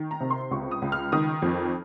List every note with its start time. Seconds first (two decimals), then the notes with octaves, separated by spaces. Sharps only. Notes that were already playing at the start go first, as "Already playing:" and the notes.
Already playing: D#3
0.11 A#5
0.20 C3
0.30 C6
0.51 C#2 C#6
0.71 D#6
0.82 C#2
0.92 F6
1.12 D#3 D#6
1.42 F2